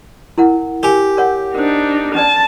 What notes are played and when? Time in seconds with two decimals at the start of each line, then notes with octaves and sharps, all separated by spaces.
0.38 E4 A#4 F#5
0.83 G4 A#4 G#5
1.17 A#4 C#5 F#5
1.55 D4 D#4 A#4 C5
2.15 C#4 B4 D5 A5